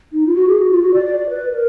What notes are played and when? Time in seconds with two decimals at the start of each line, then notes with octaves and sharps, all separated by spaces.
0.13 D#4
0.26 F4
0.35 F#4
0.48 G#4
0.59 F#4
0.71 F4
0.83 F#4
0.93 D5
1.06 D5
1.17 D5
1.29 B4
1.52 A#4